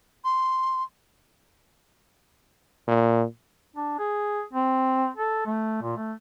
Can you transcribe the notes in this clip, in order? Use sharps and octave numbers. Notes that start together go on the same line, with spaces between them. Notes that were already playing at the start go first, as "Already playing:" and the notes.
C6
A#2
D4
G#4
C4
A4
A3
A#2
A3